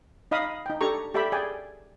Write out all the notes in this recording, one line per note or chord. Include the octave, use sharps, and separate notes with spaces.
D#4 D#5 F5 B5 D#6
D#4 G5
D4 G4 A4 A#5 C#6
G4 A4 D5 E5 G5 B5
G#4 D5 G5 G#5